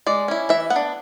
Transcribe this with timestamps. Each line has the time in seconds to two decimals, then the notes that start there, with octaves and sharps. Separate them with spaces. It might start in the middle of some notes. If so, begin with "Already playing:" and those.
0.07 G#3 D5
0.28 C#4 E4
0.49 E3 E5
0.70 B3 F#5
0.76 D4